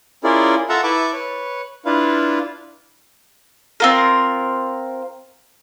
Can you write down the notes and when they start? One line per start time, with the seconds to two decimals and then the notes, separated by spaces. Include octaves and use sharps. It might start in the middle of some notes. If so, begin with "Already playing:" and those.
0.24 C#4 E4 F4 G#4 A#4 D5
0.69 F4 A4 E5 F#5 A5 A#5
0.83 E4 B4 E5 A5 C#6 D6
1.13 B4 C#5
1.85 D4 E4 F4 B4 F5
3.80 C4 F4 A#4